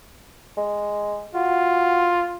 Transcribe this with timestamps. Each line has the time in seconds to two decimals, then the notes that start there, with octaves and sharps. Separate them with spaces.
0.57 G#3
1.35 F4 F#4